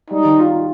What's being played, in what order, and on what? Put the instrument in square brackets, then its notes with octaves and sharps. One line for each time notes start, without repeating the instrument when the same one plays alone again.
[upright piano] G3 [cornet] D#4
[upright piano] D#3
F4
F4